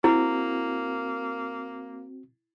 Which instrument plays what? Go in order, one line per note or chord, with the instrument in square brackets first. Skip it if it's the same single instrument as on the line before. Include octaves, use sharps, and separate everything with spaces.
[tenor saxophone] A#3 [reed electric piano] C4 F#4 [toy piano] E4